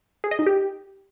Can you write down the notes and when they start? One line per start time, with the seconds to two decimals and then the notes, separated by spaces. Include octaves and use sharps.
0.24 G#4
0.31 D#5
0.39 D#4
0.46 G4